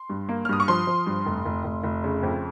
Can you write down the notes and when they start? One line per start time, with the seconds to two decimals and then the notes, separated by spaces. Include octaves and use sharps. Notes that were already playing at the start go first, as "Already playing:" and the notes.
Already playing: C6
0.10 G2
0.29 A#3
0.45 F6
0.49 G2 D#6
0.60 C#6
0.68 F3 C6
0.87 F3
1.07 G2
1.26 F1
1.45 F1
1.64 F1
1.84 F1
2.04 C#3
2.23 F2